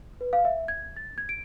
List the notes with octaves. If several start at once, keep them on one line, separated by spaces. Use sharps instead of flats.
B4
F5
E5
G#6
A6
G#6
D7